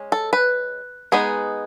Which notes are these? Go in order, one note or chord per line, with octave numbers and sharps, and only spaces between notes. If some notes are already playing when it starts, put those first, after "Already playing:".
Already playing: G#3 C#4
A4
B4
G#3 B3 D#4 G#4